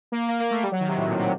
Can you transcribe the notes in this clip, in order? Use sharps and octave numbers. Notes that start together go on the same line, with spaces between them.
A#3
A#3
A#3
A3
G3
F#3
D#3
C3
A2
A#2
C3